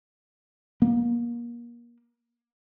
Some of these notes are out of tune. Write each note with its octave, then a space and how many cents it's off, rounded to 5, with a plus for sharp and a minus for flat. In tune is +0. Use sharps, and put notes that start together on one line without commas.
A#3 +30